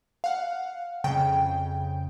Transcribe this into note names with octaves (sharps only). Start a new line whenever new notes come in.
F5 F#5
F2 C#3 G5